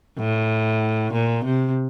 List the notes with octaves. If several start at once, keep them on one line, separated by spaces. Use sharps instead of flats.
A2
A#2
C3